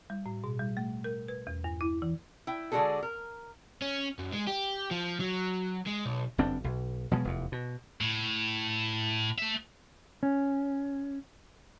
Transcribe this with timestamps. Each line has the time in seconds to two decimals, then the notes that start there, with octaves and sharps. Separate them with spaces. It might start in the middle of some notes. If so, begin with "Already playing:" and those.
0.10 G3
0.26 A2
0.44 B2
0.60 G3
0.77 A3
1.04 A#4
1.28 B4
1.47 E2
1.64 G2
1.81 E4
2.02 E3
2.47 E4 G5
2.72 D3 G#3 D4 F#4 G#4 A4
3.03 A#4
3.82 C#4
4.19 F#2
4.32 G#3
4.47 G4
4.91 F3
5.20 F#3
5.87 G#3
6.06 B1
6.38 G1 F#2 C4 D4
6.64 B1
7.11 B2 F3 F#3 G#3
7.25 F1 E2
7.52 B2
8.01 A2
9.38 A3 E5
10.23 C#4